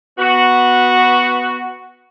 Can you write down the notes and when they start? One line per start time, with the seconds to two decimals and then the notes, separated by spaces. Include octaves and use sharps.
0.19 B3 F#4